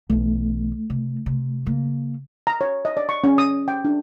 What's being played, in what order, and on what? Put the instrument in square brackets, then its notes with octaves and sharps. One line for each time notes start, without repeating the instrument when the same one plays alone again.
[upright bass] B1 E3 [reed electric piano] A3
[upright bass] C3
C3
C#3 A#3
[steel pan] A#5
C#5
D#5
D5
C#6
C#4
D#6
G5
D4